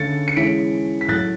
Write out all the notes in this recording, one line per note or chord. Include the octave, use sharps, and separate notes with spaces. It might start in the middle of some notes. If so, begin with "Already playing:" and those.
Already playing: D3 A3 C#4 A6 C#7
C#7
E3 G#3 C#4 B6 D7
B6
A2 F#3 A3 F#6 A6